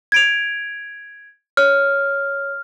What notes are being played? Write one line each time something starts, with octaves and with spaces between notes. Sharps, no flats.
G#6 D7 F7
C#5 F6